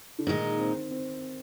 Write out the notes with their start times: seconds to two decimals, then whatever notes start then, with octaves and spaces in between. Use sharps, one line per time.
0.19 D3
0.27 A#2 D#3 G#3 D#4
0.59 C4
0.91 C4